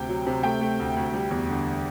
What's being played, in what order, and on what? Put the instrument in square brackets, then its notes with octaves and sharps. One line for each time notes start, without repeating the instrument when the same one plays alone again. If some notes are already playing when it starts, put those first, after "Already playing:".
Already playing: [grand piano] D2 C3 G5
F#3
C3
A3 G5
A3
D2
D2
G3
E2
D3